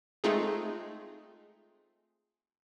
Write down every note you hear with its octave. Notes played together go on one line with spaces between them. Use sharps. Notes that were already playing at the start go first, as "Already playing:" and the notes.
G#3 A3 C4 D#4 F4 G#4